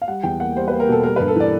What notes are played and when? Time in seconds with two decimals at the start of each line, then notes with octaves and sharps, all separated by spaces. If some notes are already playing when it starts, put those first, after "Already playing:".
0.02 F5
0.08 G3 F#5
0.23 E2 G5
0.40 A#3 F#5
0.56 G3 C5
0.68 B4
0.72 A#3
0.80 A#4
0.89 B2 A4
1.04 G3 A#4
1.16 B4
1.20 G2
1.28 A4
1.36 E3 D5